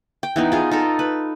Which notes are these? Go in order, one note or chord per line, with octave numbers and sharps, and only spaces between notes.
G5
E3 B3 D#4
F4 G#4 F5
D#4 A4 A#4
B4